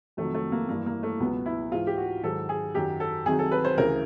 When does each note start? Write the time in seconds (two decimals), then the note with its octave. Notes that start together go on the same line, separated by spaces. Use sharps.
0.17 F2 C3 D#3 F#3 A3
0.34 A3
0.52 A#3
0.69 G2 E3 A#3
0.86 A#3
1.03 A3
1.20 C#2 B2 F#3 B3
1.46 E4
1.71 G#2 E3 F4
1.87 G4
1.97 F#4
2.23 G#2 D#3 F#3 A4
2.49 G#4
2.75 F#2 D#3 F#3 G4
3.00 A4
3.26 C2 C3 D#3 F#3 G#4
3.39 A4
3.51 B4
3.65 C5
3.77 D2 C#3 E3 A#4